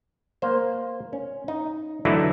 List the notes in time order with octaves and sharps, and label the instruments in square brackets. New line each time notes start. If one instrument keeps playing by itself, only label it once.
[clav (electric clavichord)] A#3 C5
C#4
D#4
D3 E3 F#3 A3 D#4 E4